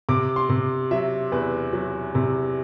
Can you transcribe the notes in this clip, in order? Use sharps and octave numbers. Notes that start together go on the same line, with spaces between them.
C3 D6
C6
C3
F#3 E5
E2 B4
F#3
C3